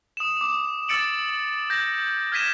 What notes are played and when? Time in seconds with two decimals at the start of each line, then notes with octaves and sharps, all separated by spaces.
0.17 D#6 E7
0.37 D6 E7
0.89 D6 E6 A6 C#7 D7 F#7
1.70 G6 A#6
2.32 F6 G#6 A#6 B6 D#7 E7